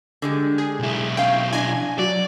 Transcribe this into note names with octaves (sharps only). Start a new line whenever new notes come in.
D3 G3 G#3
G#4
B1 E4
C#4 F5 G5
D4 D#5 G#5
F#3 D5